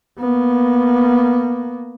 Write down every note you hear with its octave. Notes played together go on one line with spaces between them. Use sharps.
A#3 B3